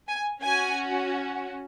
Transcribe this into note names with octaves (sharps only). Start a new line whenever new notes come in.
G#5
C#4 F#4 G#5